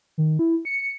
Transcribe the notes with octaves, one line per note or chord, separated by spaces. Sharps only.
D#3
E4
C#7